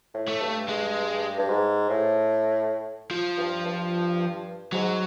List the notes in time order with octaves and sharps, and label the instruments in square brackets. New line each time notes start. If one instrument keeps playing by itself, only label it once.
[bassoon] A2
[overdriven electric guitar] A3
[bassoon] G2
[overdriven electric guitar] G#3
[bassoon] G2
G#2
A2
[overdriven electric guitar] F3
[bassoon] G2
G2
[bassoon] G#2 [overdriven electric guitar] F#3